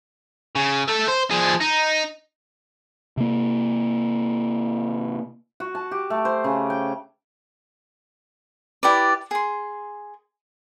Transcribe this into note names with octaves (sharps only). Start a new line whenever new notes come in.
C#3
A3 A4
C5
F3 G#4
D#4
C3 A#3
F#4
A5
G4
A3
C5
C#3
G5
E4 G4 B4 D5
G#4 C6